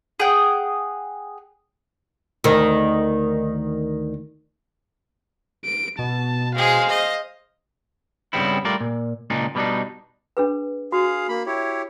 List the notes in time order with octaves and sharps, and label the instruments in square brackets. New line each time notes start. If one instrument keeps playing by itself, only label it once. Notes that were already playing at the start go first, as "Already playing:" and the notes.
[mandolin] G#4 F#5 G5
[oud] D2 D#3
[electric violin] D7
[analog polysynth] B2 [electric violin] A5
[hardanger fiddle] G#3 G#4 [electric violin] C5 F5
[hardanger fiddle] D#5
[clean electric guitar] G2 C#3 G3 B3 C4 E4
G3 A3 F4 A#4 D5
A#2
C#2 A#2 D4 D#4
B2 G3 A#3 D4 D#4
[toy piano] D4 G#4 B4
[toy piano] F#4 [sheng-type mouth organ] G#4 F5
[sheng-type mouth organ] A#3 B5
E4 G4 C#5